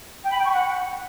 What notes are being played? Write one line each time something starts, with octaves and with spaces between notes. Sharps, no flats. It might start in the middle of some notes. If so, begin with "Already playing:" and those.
G5
B5
G5
C#6
F#5